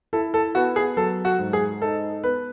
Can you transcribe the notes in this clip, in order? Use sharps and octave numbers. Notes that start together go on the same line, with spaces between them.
E4 A4
A4
B3 F#4
G#4
F#3 A4
F#4
G#2
G#4
D#4 A4
B3 B4